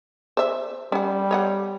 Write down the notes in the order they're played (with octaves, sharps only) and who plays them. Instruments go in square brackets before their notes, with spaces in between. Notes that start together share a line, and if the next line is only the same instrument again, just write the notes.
[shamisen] C5 E5
[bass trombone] G3 [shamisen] C#4 F#5
[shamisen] C#5 D#5 F#5